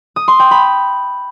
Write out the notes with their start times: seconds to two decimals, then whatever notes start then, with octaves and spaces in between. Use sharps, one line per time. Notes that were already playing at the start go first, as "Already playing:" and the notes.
0.16 D#6
0.28 C6
0.39 G5
0.51 B5